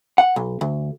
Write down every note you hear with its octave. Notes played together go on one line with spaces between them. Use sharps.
F#5
B1
D2